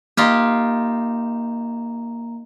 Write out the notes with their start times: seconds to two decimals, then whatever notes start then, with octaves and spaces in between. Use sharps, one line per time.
0.17 A#3 D#4 F4 G4 A#5